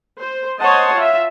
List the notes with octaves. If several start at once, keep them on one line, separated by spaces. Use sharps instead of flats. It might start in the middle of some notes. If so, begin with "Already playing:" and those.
C5
C5 C#5 D#5 F#5 A5 C6
F4 E5